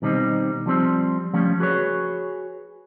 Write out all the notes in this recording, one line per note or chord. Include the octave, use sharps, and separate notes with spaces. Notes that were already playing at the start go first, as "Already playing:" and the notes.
B2 D#3 G3 C4 D4 D#4
F3 G3 C4
F3 G3 A3 C#4
F#4 G#4 B4 C#5